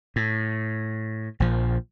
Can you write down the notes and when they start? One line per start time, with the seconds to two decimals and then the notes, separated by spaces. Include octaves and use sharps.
0.16 A2
1.40 A#1 F3